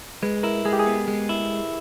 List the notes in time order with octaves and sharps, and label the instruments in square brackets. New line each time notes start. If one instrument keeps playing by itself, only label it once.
[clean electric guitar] G#3 [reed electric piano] B4
[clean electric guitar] E4 [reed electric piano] A#4
[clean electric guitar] G#3 [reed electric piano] G#4
[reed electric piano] G4
G#4
[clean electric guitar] B3
G#3
E4